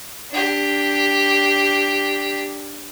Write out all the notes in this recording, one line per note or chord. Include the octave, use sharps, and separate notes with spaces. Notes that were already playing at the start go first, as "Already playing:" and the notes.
D4 G4